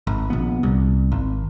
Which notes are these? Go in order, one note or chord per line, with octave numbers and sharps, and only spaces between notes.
G#1
A#1 B3
C2
G#1